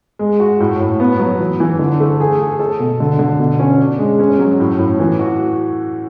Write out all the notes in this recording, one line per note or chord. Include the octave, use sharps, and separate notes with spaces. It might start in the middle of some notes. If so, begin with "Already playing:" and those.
G#3
F#4
A2
A2
B3
F#3
E3
E3
D3
A3
G#4
G#4
A4
B2
D3
D3
B2
C#4
D4
G#3
C#4
F#3
A2
A2
E3
F#4